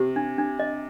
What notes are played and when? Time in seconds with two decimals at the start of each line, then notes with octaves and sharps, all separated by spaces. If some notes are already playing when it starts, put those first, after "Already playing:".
Already playing: C3 G4
0.16 D4
0.38 D4
0.59 D#5